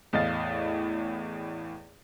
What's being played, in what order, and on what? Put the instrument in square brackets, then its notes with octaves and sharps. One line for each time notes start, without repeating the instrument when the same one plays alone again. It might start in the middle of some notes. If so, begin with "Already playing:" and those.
[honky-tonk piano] E2 A2 D#5 F5 A6